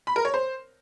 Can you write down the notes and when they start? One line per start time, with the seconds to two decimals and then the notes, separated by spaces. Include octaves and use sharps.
0.07 B5
0.16 A#4
0.25 C#5
0.34 C5